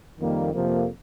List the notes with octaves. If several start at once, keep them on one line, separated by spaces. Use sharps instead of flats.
F2 D#3 G3 A#3
F2 C3 F3 A#3